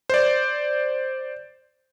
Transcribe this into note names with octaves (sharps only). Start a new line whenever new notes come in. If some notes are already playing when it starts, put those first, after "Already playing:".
C5 D5